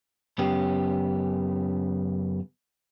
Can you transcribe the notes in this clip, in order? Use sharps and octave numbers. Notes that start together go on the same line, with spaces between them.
F#2 C#3 B3 G4